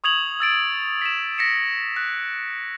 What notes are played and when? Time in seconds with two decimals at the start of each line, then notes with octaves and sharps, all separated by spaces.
0.04 C#6 D#6 G#6 F7 F#7
0.40 E6 A6 D7
1.02 B6 E7
1.38 A#6 B6 C#7 E7
1.96 F#6